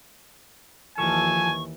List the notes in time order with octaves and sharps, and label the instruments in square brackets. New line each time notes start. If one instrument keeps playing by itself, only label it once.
[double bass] D#2 E3 [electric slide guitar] F3 A4 [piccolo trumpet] G#5 [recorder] C#6